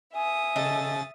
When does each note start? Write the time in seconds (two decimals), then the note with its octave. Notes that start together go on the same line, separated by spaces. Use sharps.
0.14 E5 G#5 D#6
0.56 C#3 A4 D#5 A6